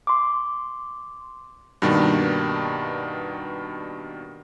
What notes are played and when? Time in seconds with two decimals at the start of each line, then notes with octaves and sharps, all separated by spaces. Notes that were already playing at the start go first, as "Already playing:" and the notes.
0.07 C6 D6
1.82 G2 B2 D#3 G3 A#3 D4